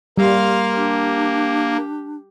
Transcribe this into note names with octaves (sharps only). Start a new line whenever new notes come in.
G3 A#3 F5 C6 F6
D4 G4